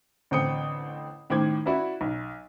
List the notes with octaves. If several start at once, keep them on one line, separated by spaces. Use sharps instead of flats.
A1 D3 C4 G5 D#6 C#7
A2 D#3 C5 G5 D6 G#6
E4 F#4 B4 D5 E5
B1